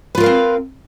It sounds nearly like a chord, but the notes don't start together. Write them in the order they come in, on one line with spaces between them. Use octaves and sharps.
B4 F4 A#4 F5 C4